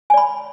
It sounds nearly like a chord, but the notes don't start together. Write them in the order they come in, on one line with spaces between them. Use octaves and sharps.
G#5 D5 B5